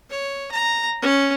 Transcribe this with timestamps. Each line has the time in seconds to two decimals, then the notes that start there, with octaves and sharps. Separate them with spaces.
0.10 C#5
0.52 A#5
1.03 C#4